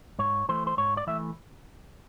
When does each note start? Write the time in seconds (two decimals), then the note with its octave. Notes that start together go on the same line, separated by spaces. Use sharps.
0.19 G#2 C#5
0.49 E3 A3 C5
0.67 C5
0.77 G#2 C#5
0.97 D5
1.07 E3 A3 E5